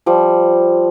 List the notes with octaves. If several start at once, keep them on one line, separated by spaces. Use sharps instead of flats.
F3 G3